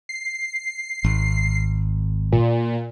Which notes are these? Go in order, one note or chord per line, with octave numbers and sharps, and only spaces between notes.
C7
G#1
A#2